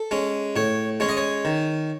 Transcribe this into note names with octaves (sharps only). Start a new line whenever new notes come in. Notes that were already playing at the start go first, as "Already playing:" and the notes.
Already playing: A4
G#3 C#4
A2 C#5
G#3 C#4 C#5
D#5
C#5
D#3